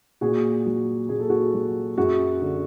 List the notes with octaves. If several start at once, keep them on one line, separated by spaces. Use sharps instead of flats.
A#2 F#4 G#4
F#3
A#2 G#4
A4
F#4 G#4
F#3
F#2 F#4 G#4
D3